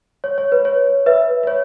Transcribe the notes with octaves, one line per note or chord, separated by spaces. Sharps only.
C#5
C#5
B4
C#5
B4 E5
B4
C#5